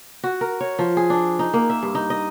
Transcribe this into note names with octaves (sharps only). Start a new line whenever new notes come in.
F#4
A#4
C#5
F3
G#4
D4
D#4
A#3
E5
G2
D#4
D#5